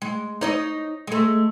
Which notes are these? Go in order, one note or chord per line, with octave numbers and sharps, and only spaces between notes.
G#3
D#4 C#5 D#5
G#3 A3